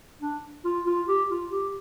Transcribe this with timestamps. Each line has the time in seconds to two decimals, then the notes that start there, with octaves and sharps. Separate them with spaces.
0.21 D4
0.65 F4
0.86 F4
1.08 G4
1.30 F4
1.51 G4